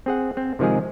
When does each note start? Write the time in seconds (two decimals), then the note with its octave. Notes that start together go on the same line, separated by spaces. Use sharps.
0.06 C4 G#4 F#5
0.37 C4
0.59 C3 D#3 F3 G#3 G#4